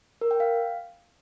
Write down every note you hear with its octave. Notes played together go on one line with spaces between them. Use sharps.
A#4
G5
F5